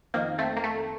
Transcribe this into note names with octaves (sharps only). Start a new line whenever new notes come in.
F2 D#3 A#3
A3 C4
A#3
A3